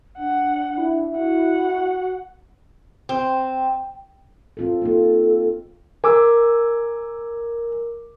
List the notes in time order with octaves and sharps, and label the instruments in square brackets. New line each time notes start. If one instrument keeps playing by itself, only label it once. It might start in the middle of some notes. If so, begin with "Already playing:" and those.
[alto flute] D4 [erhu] F#5
[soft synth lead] E4
[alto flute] F#4 [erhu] F#5
[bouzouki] C4
[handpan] C4 F4 A4
[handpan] A#3 D#4 F4 [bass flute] A4
[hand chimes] A#4 [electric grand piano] G#5 D6 E6